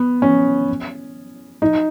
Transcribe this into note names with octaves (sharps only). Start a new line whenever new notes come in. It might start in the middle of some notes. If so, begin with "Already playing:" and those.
Already playing: B3
C#4
D#4